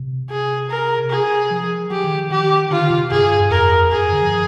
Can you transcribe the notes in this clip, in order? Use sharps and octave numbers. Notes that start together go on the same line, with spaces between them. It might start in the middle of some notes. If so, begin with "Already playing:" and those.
Already playing: C3
G#4
A#4
G#4
F3
F3 G4
D#3
D#3 G4
D3 F4
D3
C3
G2 G#4
G2
F2 A#4
F2 G#4
G2
D3
F3